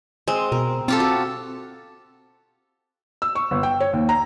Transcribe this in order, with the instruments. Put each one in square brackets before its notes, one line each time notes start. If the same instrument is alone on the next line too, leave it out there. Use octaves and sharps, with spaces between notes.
[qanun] G#3 [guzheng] C4
[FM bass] B2 [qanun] A#4
[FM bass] C4 [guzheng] F4 G4 A4
[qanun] F#4
[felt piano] E6
C#6
G1
G5
C#5
D#2
A#5